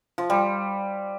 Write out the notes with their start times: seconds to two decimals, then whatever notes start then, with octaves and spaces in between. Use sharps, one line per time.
0.18 F3
0.30 G3